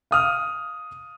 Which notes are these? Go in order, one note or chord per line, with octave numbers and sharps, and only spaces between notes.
F5 D#6 F6